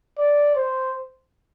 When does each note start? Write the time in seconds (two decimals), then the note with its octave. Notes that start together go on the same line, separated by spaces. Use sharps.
0.18 D5
0.55 C5